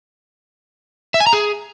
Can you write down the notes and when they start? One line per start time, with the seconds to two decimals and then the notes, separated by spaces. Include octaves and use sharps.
1.14 E5
1.20 G#5
1.27 A#5
1.33 G#4